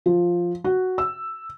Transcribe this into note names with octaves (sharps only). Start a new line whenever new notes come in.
F3
F#4
E6